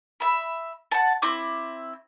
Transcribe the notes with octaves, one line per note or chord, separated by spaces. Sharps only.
E5 B5
F#5 A5
C4 E4 D6